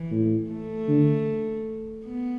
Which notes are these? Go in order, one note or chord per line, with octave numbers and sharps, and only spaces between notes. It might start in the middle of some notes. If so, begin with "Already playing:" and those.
Already playing: E3
A2
A3
D3
B3